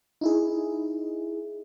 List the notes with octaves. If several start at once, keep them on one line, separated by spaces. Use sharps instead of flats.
D#4 E4 G#4